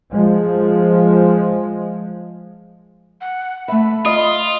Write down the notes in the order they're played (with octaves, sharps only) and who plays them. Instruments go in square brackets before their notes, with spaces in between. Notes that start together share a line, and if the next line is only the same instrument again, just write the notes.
[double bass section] F3 G#3
[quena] F#5
[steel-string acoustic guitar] A3 E5 [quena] B5
[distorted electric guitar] F4 [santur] D#5